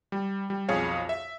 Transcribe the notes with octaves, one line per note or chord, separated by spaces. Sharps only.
G3
G3
B1 F2 G#4 C#5 F5
E5